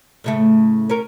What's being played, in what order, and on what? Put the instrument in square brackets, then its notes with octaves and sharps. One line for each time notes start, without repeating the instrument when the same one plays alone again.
[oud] A2 C#3 A3
C#4 A#4